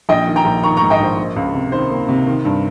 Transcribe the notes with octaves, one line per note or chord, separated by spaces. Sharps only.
A#1 D#5 G5
D#3
G5 A#5
A#1
D#3 A#5 C#6
G#2 A#5 C#6
D#5 G5
A#1 C5
A#3
C#2
C3
D#3 C5
A#3
C3
D#3
G2